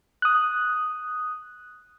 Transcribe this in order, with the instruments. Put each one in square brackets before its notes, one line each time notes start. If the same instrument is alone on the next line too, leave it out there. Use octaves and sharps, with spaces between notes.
[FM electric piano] D#6 F#6